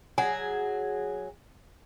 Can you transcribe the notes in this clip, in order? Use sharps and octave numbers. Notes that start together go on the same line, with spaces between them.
F#3 G#4 F#5 G#5